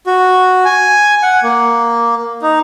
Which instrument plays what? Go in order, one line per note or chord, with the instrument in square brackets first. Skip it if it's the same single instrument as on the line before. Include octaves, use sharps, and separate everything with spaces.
[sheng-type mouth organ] F#4
G#5
F#5
A#3
D#4